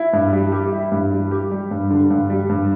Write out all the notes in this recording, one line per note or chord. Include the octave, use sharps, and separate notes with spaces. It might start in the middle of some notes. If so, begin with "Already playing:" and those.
Already playing: E4
G2
G3
G4
E4
G2
G3
G4
G3
G2
D3
G2
G3
G2